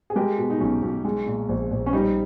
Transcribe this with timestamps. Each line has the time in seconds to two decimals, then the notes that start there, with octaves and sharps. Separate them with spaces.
0.10 G#4
0.16 G#3 G4 A#4
0.38 B2
0.50 D#4
0.60 B1 C#4
0.82 B1
1.05 G#3
1.26 A#2
1.49 A#1
1.71 A#1
1.86 C#4
1.93 G3 D#4